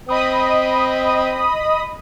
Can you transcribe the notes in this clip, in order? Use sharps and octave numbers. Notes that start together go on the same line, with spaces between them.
C4 D#5 B5 D#6